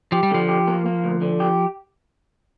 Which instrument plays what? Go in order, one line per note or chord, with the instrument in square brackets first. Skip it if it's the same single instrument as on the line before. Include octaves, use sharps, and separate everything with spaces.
[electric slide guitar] F3 [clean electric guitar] G4
[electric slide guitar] G3
[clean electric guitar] D3 [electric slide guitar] F3
[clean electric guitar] G4
A#3
A#3
D2
D3
G4